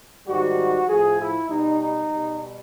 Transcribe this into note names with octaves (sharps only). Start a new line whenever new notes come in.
G#2 D#3 G3 F#4
A2 F3 G#4
E4
B2 G3 D#4
D#4
B2 G3